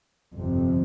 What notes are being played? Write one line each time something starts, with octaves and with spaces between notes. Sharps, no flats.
G1 F2 C3